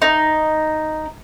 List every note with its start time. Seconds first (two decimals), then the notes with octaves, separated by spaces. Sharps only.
0.02 D#4